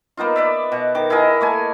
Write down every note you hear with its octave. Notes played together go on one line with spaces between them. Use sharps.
A#3 B3 D#4 F4
B4 D5 E5
B2
D#3 D6
E4 G#4 A#4 D#5
A3 A#3 G#5